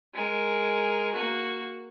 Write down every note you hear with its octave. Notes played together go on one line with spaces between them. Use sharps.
G#3 A#4
A#3 F#4